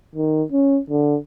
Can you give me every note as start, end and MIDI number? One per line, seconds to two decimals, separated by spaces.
0.15 0.43 51
0.52 0.80 61
0.90 1.17 50